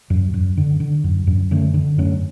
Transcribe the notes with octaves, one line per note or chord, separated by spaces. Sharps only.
F#2
F#2
D3
D3
F#2
F#2
D3 A3 C#4
D3
F#2 A3 C#4